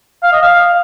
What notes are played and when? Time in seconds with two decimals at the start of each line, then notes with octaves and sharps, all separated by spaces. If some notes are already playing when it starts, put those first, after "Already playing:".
0.23 F5
0.33 D#5
0.42 F5